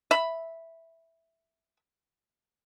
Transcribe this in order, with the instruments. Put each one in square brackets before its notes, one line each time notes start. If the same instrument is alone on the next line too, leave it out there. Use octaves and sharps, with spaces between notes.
[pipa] E5 B5